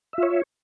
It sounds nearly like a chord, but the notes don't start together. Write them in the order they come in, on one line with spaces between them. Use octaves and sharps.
E5 F4 C#5